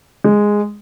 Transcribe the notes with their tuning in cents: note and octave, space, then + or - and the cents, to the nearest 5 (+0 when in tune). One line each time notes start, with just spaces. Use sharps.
G#3 -5